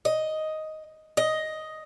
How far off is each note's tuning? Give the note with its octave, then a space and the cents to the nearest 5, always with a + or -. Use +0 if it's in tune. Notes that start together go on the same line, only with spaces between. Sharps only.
D#5 +5
D#5 +5